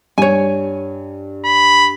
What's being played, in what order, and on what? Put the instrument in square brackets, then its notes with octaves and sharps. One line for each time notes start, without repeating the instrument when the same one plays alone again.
[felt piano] G2 [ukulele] C#5 G#5
[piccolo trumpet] B5